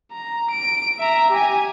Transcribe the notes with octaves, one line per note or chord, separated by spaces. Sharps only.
A#5
D7
E5 A#5
G4 G#5